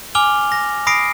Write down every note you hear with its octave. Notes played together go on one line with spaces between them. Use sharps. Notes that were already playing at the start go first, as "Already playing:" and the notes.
G#5 D6 F6 F7 G7
A#6
B5 D#6 A#6 C7 D7